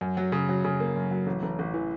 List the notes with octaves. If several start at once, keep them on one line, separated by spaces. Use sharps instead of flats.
F#2
F#3
C#3
F#3
C#3
A#3
F#2
F#3
A1
A1
A1
E3